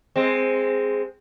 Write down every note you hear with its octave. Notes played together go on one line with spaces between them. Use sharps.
G#3 C4